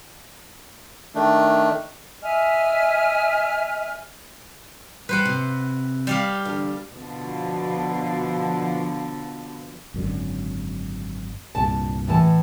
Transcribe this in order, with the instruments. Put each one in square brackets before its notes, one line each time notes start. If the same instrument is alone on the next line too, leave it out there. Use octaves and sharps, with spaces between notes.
[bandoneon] D#3 A3 D4
[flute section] D#5 E5 G#5 F6
[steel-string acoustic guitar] G3 [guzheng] B4 C5 F#5
[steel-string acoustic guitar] C3
[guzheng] G3 G4 F5
[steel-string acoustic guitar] E2 D3
[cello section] B2 D3 F3
[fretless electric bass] G#1 F#2 D3
[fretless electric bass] C2 G2 A#2 [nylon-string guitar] A5
[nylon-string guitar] A2 E3 A5